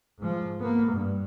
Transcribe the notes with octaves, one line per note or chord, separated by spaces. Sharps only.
G#2 F3
A#3 B3
G2